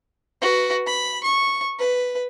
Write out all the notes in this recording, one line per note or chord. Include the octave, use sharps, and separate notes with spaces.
F#4 B4
B5
C#6
B4